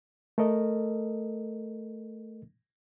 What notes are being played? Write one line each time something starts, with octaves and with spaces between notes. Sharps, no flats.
A3 A4 A#4 D#5